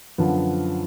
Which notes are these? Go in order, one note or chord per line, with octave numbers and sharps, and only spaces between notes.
F#2 D3 F3 B3